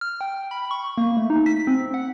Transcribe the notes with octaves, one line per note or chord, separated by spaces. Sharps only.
F6
G5
B5
C#6
A#3
A3
D#4
B6
C4
F#5